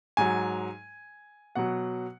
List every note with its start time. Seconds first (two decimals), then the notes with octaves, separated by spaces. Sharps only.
0.17 G#2 F#3 G#5
1.55 B2 F#3 F#5